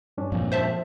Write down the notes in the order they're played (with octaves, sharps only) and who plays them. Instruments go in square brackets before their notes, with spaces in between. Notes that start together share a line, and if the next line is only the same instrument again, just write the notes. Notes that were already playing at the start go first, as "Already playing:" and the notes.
[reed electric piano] G2 C#4 D4
[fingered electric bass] F2 A#2
[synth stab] C5 E5 A5